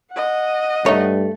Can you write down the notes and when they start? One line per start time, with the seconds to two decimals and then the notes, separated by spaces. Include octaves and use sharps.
0.12 D#5 F#5
0.86 G2 A3 D#4 C#5